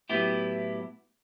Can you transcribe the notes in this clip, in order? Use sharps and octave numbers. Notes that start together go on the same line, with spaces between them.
A2 F#3 B3 E4 G4